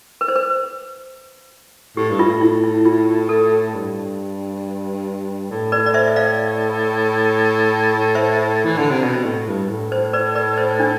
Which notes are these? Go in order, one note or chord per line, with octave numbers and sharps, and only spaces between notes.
B4
C5
B4
A2 G4
G2
F4
A2
E4
E4
F4
A4
G2
A2
B4 D5
D5
C5 E5
E5
D5 F5
C5 E5
E3
D3
C3
B2
A2
G2
A2
C5
B4 D5
B4 D5
C5
D4